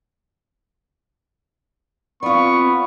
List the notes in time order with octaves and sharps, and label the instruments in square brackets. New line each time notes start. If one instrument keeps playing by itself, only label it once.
[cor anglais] B3 [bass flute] C4 [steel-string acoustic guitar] F4 D5 [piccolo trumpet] C#6